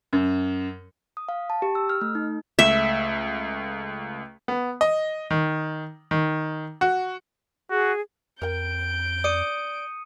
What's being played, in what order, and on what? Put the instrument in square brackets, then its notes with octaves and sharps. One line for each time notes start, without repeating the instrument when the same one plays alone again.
[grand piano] F#2
[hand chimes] D#6
F5
A5
G4
E6
F6
A3
D#4
[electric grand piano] C#2 A3 B6 [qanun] E5
[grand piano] B3
D#5
D#3
D#3
F#4
[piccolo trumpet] F#4 [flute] G#4
[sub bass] F2 [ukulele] A#4 G5 [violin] G6 D7
[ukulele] D5 [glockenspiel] D#6 C#7 D#7